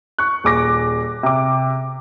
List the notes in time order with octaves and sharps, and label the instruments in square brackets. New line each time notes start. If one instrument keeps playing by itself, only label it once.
[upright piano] C#6 F#6
D#1 G#4 D6 A#6
C3 D6